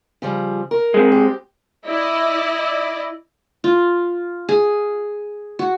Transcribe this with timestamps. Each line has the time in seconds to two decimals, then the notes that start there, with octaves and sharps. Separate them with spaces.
0.22 C#3 F3 G3
0.71 A#4
0.94 G#3 C4
1.12 G4
1.87 E4 D5 D#5
3.64 F4
4.49 G#4
5.59 F#4